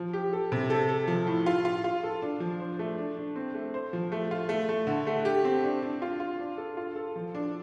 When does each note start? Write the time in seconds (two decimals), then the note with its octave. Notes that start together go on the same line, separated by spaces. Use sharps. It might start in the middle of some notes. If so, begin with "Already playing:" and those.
Already playing: F3
0.13 G4
0.33 A4
0.52 C3
0.70 A4
0.89 A4
1.08 F3
1.27 A2
1.46 F4
1.65 F4
1.84 F4
2.03 A4
2.22 D4
2.40 F3
2.60 C5
2.79 A3
2.98 D4
3.17 D4
3.36 C4
3.55 A3
3.74 C5
3.93 F3
4.12 A3
4.31 F4
4.49 A3
4.69 A3
4.87 D3
5.07 A3
5.25 G4
5.45 C4
5.64 D4
5.82 D4
6.02 F4
6.20 F4
6.40 D4
6.58 A4
6.77 F4
6.96 A4
7.16 F3
7.35 D4